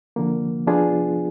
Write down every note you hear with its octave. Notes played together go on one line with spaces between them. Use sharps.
D3 F3 A#3
F3 B3 D4 F4 G#4